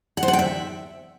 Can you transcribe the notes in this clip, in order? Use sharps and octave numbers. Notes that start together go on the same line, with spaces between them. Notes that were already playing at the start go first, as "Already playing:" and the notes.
F#5
C5
F#5
G5
E5